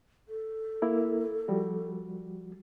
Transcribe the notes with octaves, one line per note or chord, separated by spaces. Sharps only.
A4
A#3 E4 A#4
F3 G3 F#4